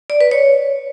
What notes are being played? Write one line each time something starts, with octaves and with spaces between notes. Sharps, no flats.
D5
B4
C#5